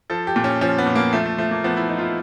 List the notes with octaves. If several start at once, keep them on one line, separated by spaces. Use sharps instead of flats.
F3 A4
G4
A#2
C#4
F3 C#4
B3
A#2
A#3
F3 A3
A3
F3 A3
A#3
F3 B3
E4
F3 D#4
F4
E4